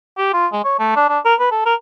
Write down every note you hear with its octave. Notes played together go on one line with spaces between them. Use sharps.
G4
F4
G#3
C#5
A3
D4
D4
A#4
B4
A4
A#4